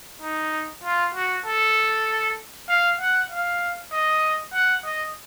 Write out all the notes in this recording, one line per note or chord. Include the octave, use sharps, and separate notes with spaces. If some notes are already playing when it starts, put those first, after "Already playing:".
D#4
F4
F#4
A4
F5
F#5
F5
D#5
F#5
D#5